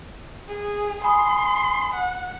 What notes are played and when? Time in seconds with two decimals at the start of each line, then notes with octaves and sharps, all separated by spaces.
0.48 G#4
1.04 G#5 B5 C6 D#6
1.94 F#5